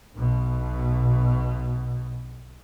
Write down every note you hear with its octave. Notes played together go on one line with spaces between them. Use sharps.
B1 B2